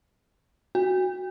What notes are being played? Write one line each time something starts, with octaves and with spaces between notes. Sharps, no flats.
F#4